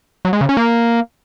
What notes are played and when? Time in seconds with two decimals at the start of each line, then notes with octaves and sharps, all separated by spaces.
0.25 F#3
0.33 G#3
0.41 C#3
0.49 C#4
0.57 A#3